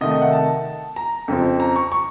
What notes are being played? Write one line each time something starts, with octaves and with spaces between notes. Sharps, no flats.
C3 D#3 A3 D#5
D#5
F#5
A5
A#5
F2 C#3 F3 C4
A#5
C#6
C#6